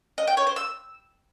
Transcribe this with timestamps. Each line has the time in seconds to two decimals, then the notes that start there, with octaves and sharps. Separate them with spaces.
0.18 D#5
0.27 G5
0.37 C#5
0.47 C5
0.56 E6